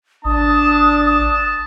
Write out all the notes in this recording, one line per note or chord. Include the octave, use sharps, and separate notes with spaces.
G#1 D4 A5 D#6